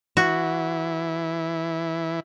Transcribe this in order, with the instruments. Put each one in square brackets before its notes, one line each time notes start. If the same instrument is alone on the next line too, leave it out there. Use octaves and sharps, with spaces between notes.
[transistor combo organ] E3 [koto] F#4